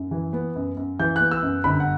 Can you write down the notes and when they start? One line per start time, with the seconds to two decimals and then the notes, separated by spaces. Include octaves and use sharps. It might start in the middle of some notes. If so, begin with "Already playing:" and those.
Already playing: F#2
0.11 E3
0.33 B3
0.56 F#2
0.77 F#2
0.99 E3 G6
1.16 B3 F#6
1.31 E6
1.42 F#2
1.64 G1 B5
1.80 F#5